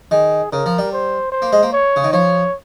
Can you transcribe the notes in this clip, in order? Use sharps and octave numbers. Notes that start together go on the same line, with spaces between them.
D#3 G#4
C#3 A#4
F3
G3
C5
C5
A#3
G#3
A#3
C#5
C#3
D#3
F3 C#5